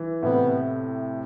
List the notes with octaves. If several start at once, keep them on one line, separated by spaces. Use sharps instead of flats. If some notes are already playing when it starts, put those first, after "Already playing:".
Already playing: E3
A2 C3 B3